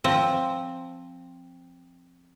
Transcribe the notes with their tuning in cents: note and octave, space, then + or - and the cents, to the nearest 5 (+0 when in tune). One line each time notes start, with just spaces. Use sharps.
F3 +0 C4 +5